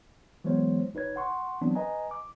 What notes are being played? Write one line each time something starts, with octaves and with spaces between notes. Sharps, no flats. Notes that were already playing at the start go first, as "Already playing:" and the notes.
E3 F#3 G#3 B3 C5 C#5
G1 D#4 B4 C#5 G#6
F#5 C6 C#6
E3 F#3 B3 C4 D4
B4 D#5 G#5 A#5
D6